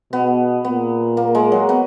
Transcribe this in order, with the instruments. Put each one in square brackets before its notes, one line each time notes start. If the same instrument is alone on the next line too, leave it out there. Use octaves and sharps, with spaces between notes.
[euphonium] B2 [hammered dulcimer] B3
[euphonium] A#2 [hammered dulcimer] B3
[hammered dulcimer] A#3
G#3
F#3
B3